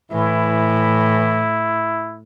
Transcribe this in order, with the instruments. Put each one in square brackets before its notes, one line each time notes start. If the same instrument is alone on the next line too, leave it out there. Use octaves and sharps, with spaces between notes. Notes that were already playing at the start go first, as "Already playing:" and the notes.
[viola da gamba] A2 [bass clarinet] E3 [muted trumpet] E4